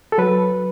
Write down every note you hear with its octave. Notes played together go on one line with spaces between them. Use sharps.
A4
F#3 B4